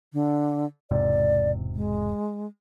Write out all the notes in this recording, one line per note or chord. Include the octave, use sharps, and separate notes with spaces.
D3
E1 G#2 C3 D5
G#3